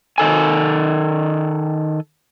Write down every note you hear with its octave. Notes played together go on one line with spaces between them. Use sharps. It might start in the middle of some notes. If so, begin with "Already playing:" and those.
D#3 A4 G#5